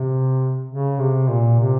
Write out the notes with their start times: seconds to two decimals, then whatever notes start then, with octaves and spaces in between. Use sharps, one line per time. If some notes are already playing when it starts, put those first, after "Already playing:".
Already playing: C3
0.69 C#3
0.99 C3
1.29 A#2
1.59 C3